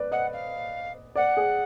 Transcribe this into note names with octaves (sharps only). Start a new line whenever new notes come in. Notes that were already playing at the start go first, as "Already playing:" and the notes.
Already playing: B4 D5
D#5 F#5
F5
D5 F#5
G#4